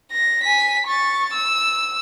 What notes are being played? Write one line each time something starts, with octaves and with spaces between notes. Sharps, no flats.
A#6
G#5 B6
C#6 A6
E6